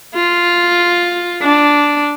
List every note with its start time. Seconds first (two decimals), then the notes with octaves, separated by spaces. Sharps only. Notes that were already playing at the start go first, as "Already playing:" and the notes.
0.15 F4
1.42 D4